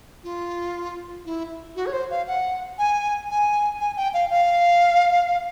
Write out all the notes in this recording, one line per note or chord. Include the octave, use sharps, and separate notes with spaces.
F4
E4
F#4
C#5
C5
F5
F#5
G#5
G#5
G#5
G5
F5
F5